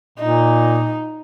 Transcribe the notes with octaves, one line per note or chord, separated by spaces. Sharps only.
A#2 D#4